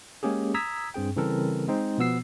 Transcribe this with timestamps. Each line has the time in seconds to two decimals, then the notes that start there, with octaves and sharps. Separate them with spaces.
0.23 G#3 A#3 C#4 G4 G#4
0.54 A#5 D#6 E6 G#6 B6
0.94 G2 C4 G#4 G5
1.16 C#3 E3 G3 C4 A4 A#4
1.68 G#3 C4 D#4 C5
1.98 B2 F3 B3 E6 C7